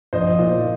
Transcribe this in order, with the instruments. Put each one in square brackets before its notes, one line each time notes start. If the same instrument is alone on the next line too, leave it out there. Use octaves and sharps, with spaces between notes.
[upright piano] A#1 [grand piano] C5 D#5
[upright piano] A#2